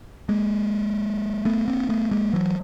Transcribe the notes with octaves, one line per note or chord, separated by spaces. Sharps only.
G#3 A#3
A3 B3
A#3 C4
A3 B3
G#3 A#3
E3 F#3